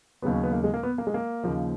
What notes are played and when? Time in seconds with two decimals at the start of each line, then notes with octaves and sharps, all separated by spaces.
0.22 D#2 C#3 F#3 B3
0.33 C#4
0.43 B3
0.53 A#3
0.64 G#3
0.74 A#3
0.83 B3
0.98 A#3
1.07 G#3
1.14 A#3
1.44 D#2 C#3 F3